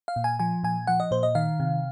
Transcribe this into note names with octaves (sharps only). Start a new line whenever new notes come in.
F5
A#2
G#5
F3 G#5
A#2 G#5
F3 F#5
D#5
A#2 C5
D#5
D#3 F5
C3